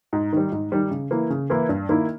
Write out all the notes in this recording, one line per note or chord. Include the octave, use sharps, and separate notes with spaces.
G#2
D#3 G3
G#2
D#3 G3
C#3
E3 A#3 E4
C#3
E3 A#3 E4
G2
D#3 A#3 E4